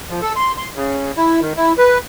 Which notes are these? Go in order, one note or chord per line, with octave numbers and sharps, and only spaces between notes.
F3
A4
C6
C6
C#3
E4
D#3
E4
B4